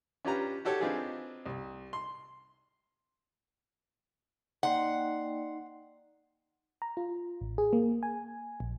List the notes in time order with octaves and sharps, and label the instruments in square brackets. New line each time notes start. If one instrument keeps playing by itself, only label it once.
[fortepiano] C#4 D4 F4 G4 B4 A#5
F#4 G4 A4 C#5 C#6
C4 D4 D#4 F4 G#4 B4
C2
C6
[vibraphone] A#3 D5 G5 [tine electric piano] D#4 C6 C7 [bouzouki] F#5
[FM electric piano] A#5
F4
A1
G#4
A#3
G#5
A#1